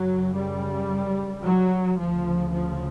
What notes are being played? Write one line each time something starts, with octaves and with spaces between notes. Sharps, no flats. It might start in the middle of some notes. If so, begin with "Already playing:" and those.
Already playing: F#2 C#3 F#3
G3
F#3
D2 C#3 F3
F3